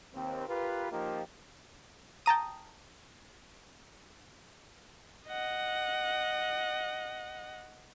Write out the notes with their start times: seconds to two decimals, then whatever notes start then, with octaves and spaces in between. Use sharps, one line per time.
0.14 D#2 C4
0.49 F4 G4 A#4 B4
0.92 F3 A#3 D#4 F4 G4
2.26 G5 A5 A#5 D#6
5.28 D#5 F#5